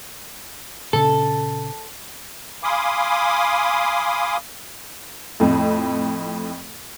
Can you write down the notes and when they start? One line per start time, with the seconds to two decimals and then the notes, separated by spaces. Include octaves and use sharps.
0.93 A#2 C#3 C#4 A4
2.63 F5 G#5 B5 C6 D6 D#6
5.40 F2 A2